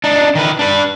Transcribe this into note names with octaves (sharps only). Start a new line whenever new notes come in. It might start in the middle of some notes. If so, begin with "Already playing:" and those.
D4 D#4
D#3 B4
D4 B4